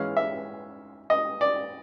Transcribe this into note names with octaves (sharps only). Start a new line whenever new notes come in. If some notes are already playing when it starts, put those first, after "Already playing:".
Already playing: G#2 E3 G#3 C#4 F5
E5
D#5
D5